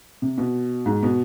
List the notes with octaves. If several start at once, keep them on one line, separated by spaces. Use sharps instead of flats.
C3
B2
G#2
B2